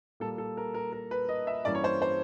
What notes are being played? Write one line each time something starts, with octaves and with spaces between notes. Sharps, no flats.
A#2 G3 A#3 A4
A4
A#4
A#4
A#4
B4
D#5
E5
G2 E3 G3 A#3 C#4 D5
C#5
C5
C5